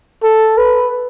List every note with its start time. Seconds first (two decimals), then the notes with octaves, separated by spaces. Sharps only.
0.23 A4
0.58 B4